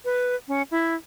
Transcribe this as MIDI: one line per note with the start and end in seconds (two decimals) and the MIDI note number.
0.05 0.36 71
0.48 0.62 61
0.71 0.95 64